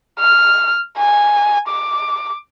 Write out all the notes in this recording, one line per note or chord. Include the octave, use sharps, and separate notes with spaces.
F6
G#5
D6